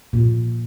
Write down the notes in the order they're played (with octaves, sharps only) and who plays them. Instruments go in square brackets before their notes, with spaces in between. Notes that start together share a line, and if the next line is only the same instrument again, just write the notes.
[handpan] A#2